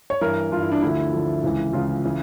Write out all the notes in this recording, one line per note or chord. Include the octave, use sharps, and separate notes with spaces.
C#5
G2 E3 A#4
G2 F4
E3
E4
D4
D2 D3 F3 E4
D2 D3 F3
C#2 C#3 E3
C#2 C#3 E3 F4
C#3 E3